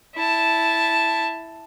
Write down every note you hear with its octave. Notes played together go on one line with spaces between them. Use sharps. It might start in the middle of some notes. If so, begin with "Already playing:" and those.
E4 A5